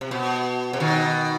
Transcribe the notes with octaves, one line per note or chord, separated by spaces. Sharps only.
C3
B2
C3
B2 D#3